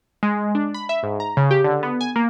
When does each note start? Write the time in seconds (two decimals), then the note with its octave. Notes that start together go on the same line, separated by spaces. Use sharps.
0.23 G#3
0.55 D4
0.74 B5
0.89 E5
1.03 G#2
1.20 A#5
1.37 C#3
1.51 G4
1.64 D3
1.83 B3
2.01 G#5
2.16 A#3